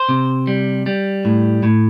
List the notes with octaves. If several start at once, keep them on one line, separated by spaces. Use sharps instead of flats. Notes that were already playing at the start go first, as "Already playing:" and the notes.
Already playing: C5
C3
G3
G3
A2
A2